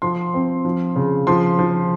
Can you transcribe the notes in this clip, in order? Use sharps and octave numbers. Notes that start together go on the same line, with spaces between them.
F3 C6
C4
F3
C#3
F3 C6
F3